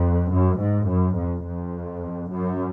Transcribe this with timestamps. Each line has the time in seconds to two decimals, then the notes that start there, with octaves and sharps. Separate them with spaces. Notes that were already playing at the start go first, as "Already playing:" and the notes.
Already playing: F2
0.30 F#2
0.59 G#2
0.87 F#2
1.16 F2
1.45 F2
2.31 F#2